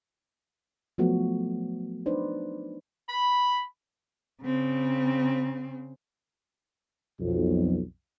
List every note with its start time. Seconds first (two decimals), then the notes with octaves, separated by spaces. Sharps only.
0.98 F3 F#3 A3 B3 F#4
2.06 D4 D#4 B4 C5 D5
3.09 B5
4.42 C#3 C4
7.20 B1 F2